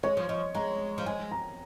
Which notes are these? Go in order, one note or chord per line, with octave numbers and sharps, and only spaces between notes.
G#3 C#5
F3
F3 D#5
G#3 A#5
F3
G#3 G#5
A#5